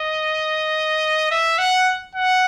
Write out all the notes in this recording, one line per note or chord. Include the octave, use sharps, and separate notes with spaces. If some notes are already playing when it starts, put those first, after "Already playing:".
Already playing: D#5
E5
F#5
F#5